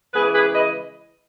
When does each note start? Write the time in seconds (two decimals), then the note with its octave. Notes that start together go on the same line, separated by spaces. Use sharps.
0.13 C#3 E3 G#3 G#4 B4
0.33 G#4 B4
0.53 B4 D#5